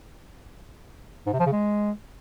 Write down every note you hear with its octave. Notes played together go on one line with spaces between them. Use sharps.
G#2
C3
F3
C#3
G#3